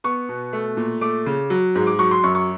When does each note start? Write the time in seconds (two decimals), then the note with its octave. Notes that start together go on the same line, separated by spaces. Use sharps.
0.04 B3 C#6
0.29 B2
0.53 A3
0.77 A#2
1.01 A3 D6
1.26 C#3
1.50 F#3
1.75 G#2
1.87 D6
1.99 F#3 C#6
2.11 C6
2.23 F#2 C#6
2.35 C#6